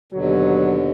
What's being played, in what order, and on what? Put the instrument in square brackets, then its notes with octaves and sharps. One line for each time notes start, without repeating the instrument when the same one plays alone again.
[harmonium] D#2 B2 D3 [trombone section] F#3